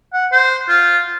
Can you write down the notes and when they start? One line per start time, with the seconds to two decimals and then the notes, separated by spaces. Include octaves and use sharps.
0.13 F#5
0.32 C5
0.68 F4